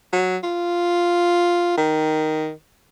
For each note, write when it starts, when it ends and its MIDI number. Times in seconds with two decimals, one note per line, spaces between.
0.13 0.37 54
0.43 1.73 65
1.78 2.52 51